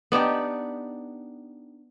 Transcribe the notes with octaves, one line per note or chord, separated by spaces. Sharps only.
B3 D4 D#4 G4